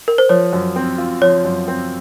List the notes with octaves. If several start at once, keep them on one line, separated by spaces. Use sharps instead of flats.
A#4
C5
F3 C#5
F#2
C4
F4
F3 C#5
F#2
C4